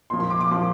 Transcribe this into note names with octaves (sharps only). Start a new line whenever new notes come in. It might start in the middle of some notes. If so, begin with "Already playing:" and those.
A#2 F3 C6
C6
D6
D6
A#2 F3 C6